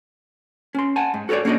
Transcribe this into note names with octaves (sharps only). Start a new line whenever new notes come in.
C#4 C6
F#5 G#5 A5
G#2
F#4 A4 A#4 C#5 D5
A#3 C#4 D4 F#4 D5 D#5